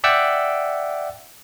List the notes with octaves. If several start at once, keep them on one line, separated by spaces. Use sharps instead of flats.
D5 E5 F#5 G5 E6